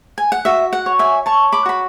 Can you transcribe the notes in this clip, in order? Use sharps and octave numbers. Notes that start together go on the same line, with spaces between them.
G#5
F#5
F#4 E5
F#5
C#5
E5 G#5
C#5 A5 C#6
B5 D6
F#4 B5